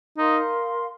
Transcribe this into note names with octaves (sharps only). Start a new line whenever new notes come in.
D#4 A#4 F5 C6